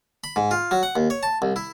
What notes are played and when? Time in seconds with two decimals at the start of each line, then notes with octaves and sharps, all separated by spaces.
0.24 B5
0.36 G#2
0.51 F4
0.71 F#3
0.83 F#5
0.96 D#2
1.10 C#5
1.23 A5
1.42 C2
1.56 E4